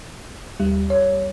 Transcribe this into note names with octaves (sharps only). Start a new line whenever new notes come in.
D#2 G3
C#5